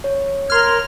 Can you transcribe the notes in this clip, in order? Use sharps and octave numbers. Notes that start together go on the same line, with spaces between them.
C#5
A#4 C6 F6 G#6